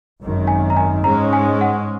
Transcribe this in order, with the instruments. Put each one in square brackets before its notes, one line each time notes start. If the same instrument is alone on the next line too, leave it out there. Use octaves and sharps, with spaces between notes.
[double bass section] G#1 F#2 D#3
[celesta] G#5
A#5
G#5
[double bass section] G#2 G#3 C#4 [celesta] A#5
[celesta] G#5
F#5